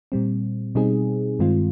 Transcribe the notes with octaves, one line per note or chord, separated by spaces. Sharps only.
A#2 G3 C4
B2 G3 C4 D#4 G#4
G2 D#3 G#3 C4 F4